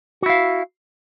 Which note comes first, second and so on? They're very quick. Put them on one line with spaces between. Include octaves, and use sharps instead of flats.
F#4 E4 F5